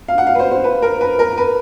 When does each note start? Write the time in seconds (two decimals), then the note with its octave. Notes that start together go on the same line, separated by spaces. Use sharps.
0.08 F5
0.18 F#5
0.27 F5
0.35 B4
0.39 C5
0.51 C5
0.64 B4
0.82 A#4
1.01 B4
1.19 A#4
1.38 B4